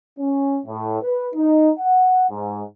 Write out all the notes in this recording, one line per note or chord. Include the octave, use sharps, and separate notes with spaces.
C#4
A2
B4
D#4
F#5
G#2